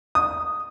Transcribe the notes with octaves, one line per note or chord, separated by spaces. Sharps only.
D#6